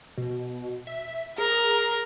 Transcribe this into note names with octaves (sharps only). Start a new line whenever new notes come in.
B2
E5
G#4 A#4